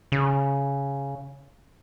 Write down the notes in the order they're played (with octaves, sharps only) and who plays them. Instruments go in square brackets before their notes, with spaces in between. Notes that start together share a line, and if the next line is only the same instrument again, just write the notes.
[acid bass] C#3